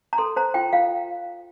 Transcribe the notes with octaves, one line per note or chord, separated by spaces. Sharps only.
A#5
A4 C6
C5 A#5
F4 G5
F4 F5